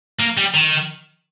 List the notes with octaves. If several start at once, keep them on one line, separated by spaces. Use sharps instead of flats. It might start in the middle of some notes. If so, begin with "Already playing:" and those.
A#3
G3
D#3